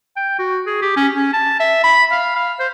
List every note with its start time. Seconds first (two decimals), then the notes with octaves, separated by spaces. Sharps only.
0.17 G5
0.39 F#4
0.67 G#4
0.82 G4
0.97 C#4
1.14 C#4
1.33 A5
1.60 E5
1.83 B5
2.11 F5
2.35 F5
2.59 C5